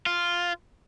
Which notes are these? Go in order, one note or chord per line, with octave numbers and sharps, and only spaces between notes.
F4